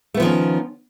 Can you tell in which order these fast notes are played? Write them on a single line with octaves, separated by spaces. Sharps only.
A3 B3 F3 D#3 C#4